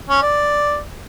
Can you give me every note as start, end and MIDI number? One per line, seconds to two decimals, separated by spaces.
0.09 0.21 61
0.22 0.78 74